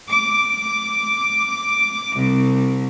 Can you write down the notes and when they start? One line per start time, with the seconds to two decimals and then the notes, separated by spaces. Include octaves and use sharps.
0.10 D6
2.17 C2